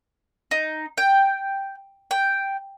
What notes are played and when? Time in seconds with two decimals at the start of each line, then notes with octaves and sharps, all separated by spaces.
0.51 D#4
0.98 G5
2.11 G5